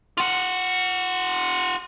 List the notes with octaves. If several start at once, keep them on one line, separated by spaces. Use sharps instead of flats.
F4 F#5